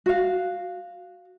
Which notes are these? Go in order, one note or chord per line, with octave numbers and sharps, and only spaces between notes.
F#4 F5